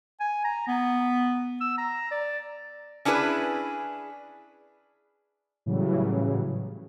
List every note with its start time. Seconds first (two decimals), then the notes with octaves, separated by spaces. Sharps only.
0.20 G#5
0.44 A#5
0.67 B3
1.61 E6
1.78 A#5
2.11 D5
3.05 C#4 D4 E4 G#4 B4
5.66 A2 C#3 E3 F#3 G3